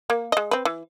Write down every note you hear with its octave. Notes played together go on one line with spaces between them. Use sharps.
A#3
G#3 D#5
C4 B4
E3